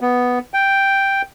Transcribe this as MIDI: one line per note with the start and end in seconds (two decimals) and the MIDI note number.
0.01 0.39 59
0.54 1.22 79